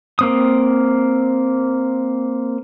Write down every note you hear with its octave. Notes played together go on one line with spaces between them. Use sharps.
A#3 C4 D#6